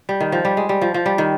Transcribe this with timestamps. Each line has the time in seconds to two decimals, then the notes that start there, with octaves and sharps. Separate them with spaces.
0.09 G3
0.20 D#3
0.32 F3
0.45 G3
0.57 G#3
0.69 G3
0.81 F3
0.94 F3
1.06 G3
1.18 D#3